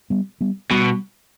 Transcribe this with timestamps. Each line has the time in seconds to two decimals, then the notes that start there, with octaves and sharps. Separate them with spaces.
0.10 G3 B3
0.41 G3 B3
0.71 B2 G3 B3